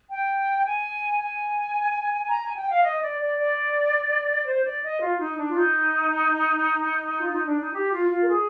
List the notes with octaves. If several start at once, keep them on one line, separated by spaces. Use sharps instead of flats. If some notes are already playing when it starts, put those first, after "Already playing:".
G5
G#5
G#5
A#5
G#5
G5
F5
D#5
D5
D5
D5
C5
D5
D#5
F4
D#4
D4
F4
D#4
F4
D#4
D4
D#4
G4
F4
F4
A#4
G#4